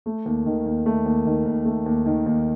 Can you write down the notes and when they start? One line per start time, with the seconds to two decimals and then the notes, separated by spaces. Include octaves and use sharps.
0.06 A3
0.26 D#2
0.46 D#3
0.66 D#2
0.86 A3
1.06 D#2
1.26 D#3
1.46 D#2
1.65 A3
1.86 D#2
2.06 D#3
2.26 D#2